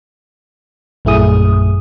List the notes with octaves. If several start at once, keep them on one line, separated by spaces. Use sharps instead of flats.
A#1 F#2 A3 E4 G#4 D#6